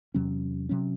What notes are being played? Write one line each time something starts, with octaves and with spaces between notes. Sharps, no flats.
E2 C3 F#3 C#4
C3 F#3 C#4